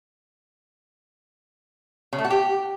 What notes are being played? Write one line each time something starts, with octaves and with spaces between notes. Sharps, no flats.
C#3
A3
F#4
G4